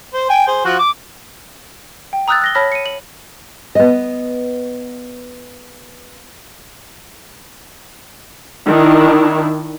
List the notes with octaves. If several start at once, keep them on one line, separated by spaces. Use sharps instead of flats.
C5
G5 G#5
G#4 C5
F3 F#4
D6
G5
A#5 D#6 E6 F#6 G6 A6
F#6 A#6 G7
C#5 A5 B5 F6 A#6 B6
C#7 D#7
F#7
B3 D#5
D#3 D4 E4